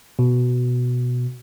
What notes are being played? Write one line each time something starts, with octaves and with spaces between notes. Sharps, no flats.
B2